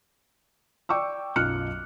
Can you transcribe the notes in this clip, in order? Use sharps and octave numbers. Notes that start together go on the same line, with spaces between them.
D5 G5 C#6 D6 E6
B1 F#2 F4 F6 F#6 C#7